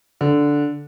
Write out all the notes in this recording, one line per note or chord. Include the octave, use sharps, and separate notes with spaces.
D3